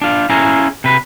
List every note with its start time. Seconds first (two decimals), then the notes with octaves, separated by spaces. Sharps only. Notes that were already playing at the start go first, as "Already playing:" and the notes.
0.02 D4 F4
0.30 C#4 E4 F4 G#4 A#5
0.84 C3 B4